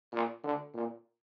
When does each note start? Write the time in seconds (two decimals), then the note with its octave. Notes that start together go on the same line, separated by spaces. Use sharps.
0.12 A#2
0.43 D3
0.74 A#2